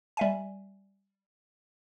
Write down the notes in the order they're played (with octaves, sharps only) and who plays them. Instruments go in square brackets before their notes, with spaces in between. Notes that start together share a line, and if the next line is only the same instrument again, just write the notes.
[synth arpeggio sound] G3 E5 G#5